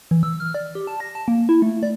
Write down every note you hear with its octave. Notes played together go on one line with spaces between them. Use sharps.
E3
E6
F6
D5
G4
A5
A#6
A5
A#3
E4
A3
D5